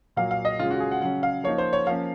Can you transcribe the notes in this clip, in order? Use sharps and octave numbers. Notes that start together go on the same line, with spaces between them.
A#2 F#3 A#3 F5
F5
D#5
C#3 G#3 C#4 F4
F#4
G#4
F#5
C#3 F#3 C#4 F#5
F5
F3 A#3 D#4 C#5
C5
C#5
F3 A#3 C#4 F5